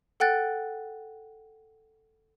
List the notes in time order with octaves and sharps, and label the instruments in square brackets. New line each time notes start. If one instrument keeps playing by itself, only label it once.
[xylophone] A4 F#5 G5 F#6 A6